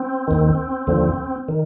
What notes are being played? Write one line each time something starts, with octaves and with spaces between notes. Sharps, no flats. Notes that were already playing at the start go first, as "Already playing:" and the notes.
Already playing: C4
D#2 D#3
D#2 D3 F3
D#3